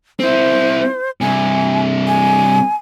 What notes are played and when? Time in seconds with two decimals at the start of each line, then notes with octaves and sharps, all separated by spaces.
0.20 C4 E4 C5
1.21 G2 C3 G#5
2.07 G#5